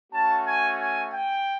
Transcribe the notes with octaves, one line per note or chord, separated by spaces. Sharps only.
A3 C#4 F#4 A5
G#5
G#5
G5